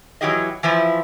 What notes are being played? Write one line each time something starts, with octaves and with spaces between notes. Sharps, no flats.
E3 F#3 E4 G4 G#4 D#5
E3 F3 E4 F4